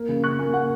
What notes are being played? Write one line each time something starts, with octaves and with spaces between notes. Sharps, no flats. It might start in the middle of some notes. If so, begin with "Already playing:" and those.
Already playing: A#3
C#3
C#3 C#6 F#6
A#3 G#5
A#3 F#5